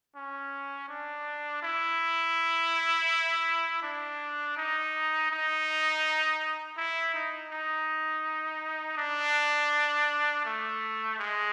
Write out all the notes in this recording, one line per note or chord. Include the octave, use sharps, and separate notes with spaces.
C#4
D4
E4
D4
D#4
D#4
E4
D#4
D#4
D4
A3
G#3